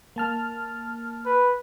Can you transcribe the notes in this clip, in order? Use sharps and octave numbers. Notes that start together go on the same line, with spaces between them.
A#3 A5 F6
B4